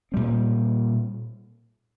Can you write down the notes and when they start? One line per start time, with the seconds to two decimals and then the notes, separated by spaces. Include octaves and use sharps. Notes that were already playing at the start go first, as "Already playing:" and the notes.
0.12 A#2 G3 C4